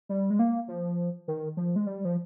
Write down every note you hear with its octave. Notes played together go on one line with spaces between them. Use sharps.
G3
G#3
A#3
F3
D#3
F3
G#3
G3
F3